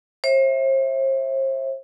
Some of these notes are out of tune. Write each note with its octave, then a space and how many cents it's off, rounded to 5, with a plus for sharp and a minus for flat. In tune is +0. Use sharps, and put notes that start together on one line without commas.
C5 +40 E5 +0